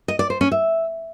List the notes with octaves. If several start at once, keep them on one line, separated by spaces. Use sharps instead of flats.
D#5
D5
C5
C#4
E5